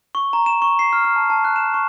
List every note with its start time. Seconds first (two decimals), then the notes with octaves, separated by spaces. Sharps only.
0.15 C#6
0.33 A#5
0.46 E7
0.62 C#6
0.79 C7
0.93 F6
1.05 F6
1.16 A5
1.30 A5
1.45 F#6
1.56 E7
1.74 C#6